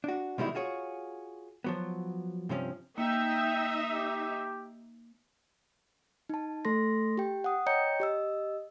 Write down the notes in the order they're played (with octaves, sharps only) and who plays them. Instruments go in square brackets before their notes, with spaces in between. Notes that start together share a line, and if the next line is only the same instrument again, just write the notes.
[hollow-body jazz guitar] D4 F#4
B2 D#3 G3 G#3 D#4 E4
F4 F#4 G#4 C#5
F3 F#3 B3
G2 C3 F3 C#4
[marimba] A#3 [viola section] D#4 E5 [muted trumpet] G5
[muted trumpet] G4
[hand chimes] D#4 A5
A3 A4 C6 A#6
G4 G5
F#5 D#6
C#5 D#5 G5 A#5 G6 C#7
G4 D#5 E6